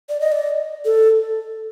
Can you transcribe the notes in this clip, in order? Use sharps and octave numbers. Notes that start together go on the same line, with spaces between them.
D5
D#5
D5
A4